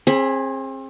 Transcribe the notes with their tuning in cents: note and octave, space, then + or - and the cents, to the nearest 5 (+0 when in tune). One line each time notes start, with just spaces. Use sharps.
C4 +35 G#4 +0 B5 +0